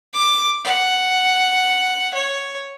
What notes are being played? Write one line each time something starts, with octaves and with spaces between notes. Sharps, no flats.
D6
F#5
C#5